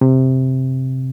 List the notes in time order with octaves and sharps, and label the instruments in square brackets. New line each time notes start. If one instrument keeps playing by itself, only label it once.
[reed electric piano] C3